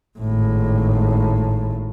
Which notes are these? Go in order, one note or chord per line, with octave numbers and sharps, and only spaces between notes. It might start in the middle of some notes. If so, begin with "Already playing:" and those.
G#1 A2